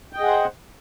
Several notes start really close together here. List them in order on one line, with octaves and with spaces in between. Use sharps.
G5 D#5 G#4 F#5 C5